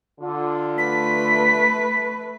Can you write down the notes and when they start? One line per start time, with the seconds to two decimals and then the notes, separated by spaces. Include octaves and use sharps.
0.21 D3 F4
0.78 A3 B4 B6